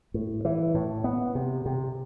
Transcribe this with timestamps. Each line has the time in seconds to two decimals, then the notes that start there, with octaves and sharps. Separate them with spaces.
0.14 A2
0.45 E3
0.74 A2
1.04 B3
1.35 C3
1.66 C3